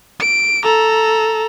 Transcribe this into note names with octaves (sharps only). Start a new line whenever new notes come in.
D7
A4 A#5